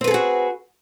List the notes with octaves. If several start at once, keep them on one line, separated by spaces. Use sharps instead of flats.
C4 F#4 G#4 A4 B4